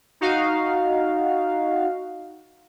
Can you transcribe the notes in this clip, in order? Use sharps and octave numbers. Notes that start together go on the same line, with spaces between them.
D#4 F#4 F5